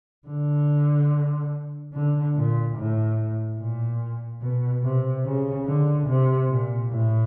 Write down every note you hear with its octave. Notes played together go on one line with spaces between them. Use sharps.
D3
D3
A#2
A2
A#2
B2
C3
C#3
D3
C3
A#2
A2